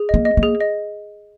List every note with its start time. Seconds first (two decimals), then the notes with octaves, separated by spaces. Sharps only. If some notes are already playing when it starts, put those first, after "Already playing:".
Already playing: G#4
0.09 A#3 D#5
0.25 D#5
0.37 A#3
0.43 G#4
0.60 D#5